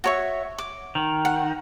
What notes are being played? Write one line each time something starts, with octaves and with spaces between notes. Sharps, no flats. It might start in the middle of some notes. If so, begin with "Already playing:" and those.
F#4 C#5 E5
D6
D#3
F#5